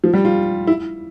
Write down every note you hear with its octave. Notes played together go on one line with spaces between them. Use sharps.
F3
G3
F4
E4